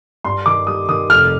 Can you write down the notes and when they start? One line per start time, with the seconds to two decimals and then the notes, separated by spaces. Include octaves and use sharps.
0.24 G2 C6
0.46 D#3 D6
0.67 G3 D#6
0.89 D#3 D#6
1.10 F1 F6